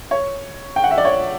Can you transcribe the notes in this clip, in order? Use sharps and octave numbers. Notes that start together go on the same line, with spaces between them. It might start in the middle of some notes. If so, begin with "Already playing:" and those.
C#5
G5
F#5
E5
D5
C#5